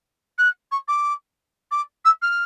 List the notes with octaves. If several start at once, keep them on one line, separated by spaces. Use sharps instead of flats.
F#6
C#6
D6
D6
E6
F6